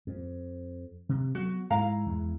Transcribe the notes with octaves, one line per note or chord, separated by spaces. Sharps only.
F2
C3
F#3 B3 F#4
G#2 G#3 E4 F5 A#5
E2 G#3